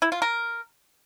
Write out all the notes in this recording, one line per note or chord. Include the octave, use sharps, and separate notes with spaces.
E4
F4
A#4